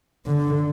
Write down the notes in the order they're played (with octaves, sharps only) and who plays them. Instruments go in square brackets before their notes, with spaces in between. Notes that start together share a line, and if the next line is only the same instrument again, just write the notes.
[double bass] D3